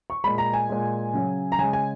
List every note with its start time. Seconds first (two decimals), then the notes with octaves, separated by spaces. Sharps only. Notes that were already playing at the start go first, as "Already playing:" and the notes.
0.10 C#6
0.24 A#2 G#3 B5
0.38 A#5
0.53 G#5
0.69 A#2 G#3
1.14 C#3 F#3
1.52 A#5
1.59 C#3 G#3 G#5
1.73 G#5